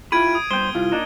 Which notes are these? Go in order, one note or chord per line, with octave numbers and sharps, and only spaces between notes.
E4 F4 G4 B5 G#6 D7 D#7
D#6
G2 B3 C5 G5 G7
C2 E4 F4 F5
A#3 D4 D#4